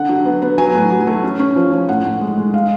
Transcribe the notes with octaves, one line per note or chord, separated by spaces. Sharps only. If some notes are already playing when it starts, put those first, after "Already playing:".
Already playing: D3 F#5
F#3
B3
B3
F#3 G#5
A2
F#3
A3
C#4
C#4
F3
F3
A2 F#5
A2
G#3
G#3
G#3 F5